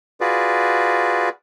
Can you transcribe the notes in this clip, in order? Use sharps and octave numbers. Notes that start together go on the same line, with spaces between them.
F4 F#4 G#4 B4 D5